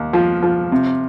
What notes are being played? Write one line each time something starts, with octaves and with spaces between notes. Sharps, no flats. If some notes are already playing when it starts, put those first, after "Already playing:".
Already playing: D#2
F3
F3
C3